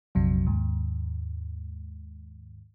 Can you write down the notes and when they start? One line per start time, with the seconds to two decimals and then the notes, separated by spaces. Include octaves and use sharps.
0.15 A#1 F2 C3 F#3
0.47 D#2 G#2